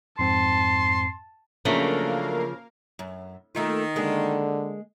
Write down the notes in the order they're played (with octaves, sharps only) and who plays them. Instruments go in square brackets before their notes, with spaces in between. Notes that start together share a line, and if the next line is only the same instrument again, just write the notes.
[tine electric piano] F2 G#2 C4 [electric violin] A5 [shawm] C6
[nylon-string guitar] C#3 F3 [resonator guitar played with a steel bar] F#3 A3 D4 [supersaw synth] A#3 A#4 F5
[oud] F#2
[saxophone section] D#3 [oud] A3 A#3 F4
[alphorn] D3 [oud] G#3 A#3 G#4